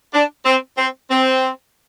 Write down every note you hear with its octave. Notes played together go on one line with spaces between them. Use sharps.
D4
C4
C4
C4